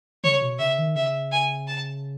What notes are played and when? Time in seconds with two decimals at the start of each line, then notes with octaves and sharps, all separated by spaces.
0.24 C#3 C#5
0.42 B2
0.60 C#3 E5
0.78 D#3
0.96 C#3 E5
1.32 G#5
1.68 A5